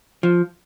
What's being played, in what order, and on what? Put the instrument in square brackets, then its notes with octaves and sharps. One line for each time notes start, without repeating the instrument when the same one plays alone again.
[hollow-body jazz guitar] F3